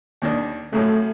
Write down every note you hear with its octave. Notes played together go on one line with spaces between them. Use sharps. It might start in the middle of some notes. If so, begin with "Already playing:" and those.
D#2 D#3 D4
F#2 A2 C#3 A3